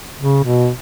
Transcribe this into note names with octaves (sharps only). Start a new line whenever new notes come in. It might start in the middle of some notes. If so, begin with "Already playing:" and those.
C#3
B2